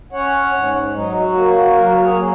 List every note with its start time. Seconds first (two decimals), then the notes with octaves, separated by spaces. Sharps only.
0.13 C#4 C#5 F#5
0.54 G#2
0.93 F#3 D#4
1.21 F#4
1.34 A#3
1.47 F#4
1.74 F#3 F#4 A#4
2.01 G#4 C#5
2.15 A#3